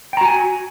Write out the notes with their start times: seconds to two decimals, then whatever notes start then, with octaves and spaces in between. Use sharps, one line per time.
0.13 G5
0.17 A#5
0.21 F#4
0.25 G#5